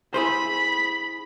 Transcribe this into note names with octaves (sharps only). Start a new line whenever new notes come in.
E4 G#4 C5 B5